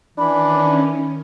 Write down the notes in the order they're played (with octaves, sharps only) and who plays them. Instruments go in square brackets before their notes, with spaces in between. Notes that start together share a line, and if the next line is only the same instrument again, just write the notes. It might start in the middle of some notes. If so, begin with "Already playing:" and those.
[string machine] D#3 C#4 [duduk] E3 [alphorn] D4 [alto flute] B5